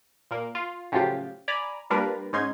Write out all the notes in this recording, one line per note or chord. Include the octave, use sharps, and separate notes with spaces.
A#2 A#3
F4
A2 C#3 F3 F#3 F4 G4
D5 G#5 A#5 B5
G3 A#3 D4 F4 A#4 B4
G#2 C#4 D#4 C6 G#6